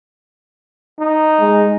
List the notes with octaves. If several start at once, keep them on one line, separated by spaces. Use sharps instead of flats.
D#4
G#3